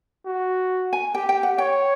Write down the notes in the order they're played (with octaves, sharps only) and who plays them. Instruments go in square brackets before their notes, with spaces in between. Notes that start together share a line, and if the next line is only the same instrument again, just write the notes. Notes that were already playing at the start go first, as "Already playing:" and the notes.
[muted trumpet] F#4
[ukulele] G#5
[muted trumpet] G4 [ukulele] G5
[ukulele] G5
F#5
[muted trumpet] C#5 [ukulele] G5